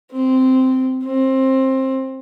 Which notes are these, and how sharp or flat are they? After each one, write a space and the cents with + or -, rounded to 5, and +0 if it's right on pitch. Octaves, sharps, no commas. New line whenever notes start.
C4 -10
C4 +20